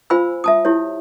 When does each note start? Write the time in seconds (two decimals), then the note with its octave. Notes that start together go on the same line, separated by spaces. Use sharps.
0.10 F4 C5 F5 G#5 B5 E6
0.44 E5 A5 D#6
0.65 E4 G4 C#5